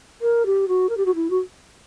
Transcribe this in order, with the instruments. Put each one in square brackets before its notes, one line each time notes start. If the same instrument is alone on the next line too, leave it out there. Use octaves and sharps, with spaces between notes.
[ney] A#4
G4
F#4
A#4
G4
F#4
E4
F#4